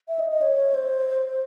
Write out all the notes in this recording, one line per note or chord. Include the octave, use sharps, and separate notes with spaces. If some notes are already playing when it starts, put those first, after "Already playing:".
E5
D#5
D#5
C#5
C5